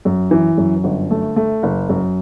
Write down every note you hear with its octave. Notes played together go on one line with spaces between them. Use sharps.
F#2
E3
F#2
G1
A3
A3
F#1
F#2